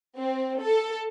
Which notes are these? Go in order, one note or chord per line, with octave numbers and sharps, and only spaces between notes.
C4
A4